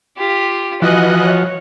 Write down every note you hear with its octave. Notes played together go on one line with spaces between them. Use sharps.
F4 G4
E3 F3 F#4 D#5 F#5 G#5 F#6
C#5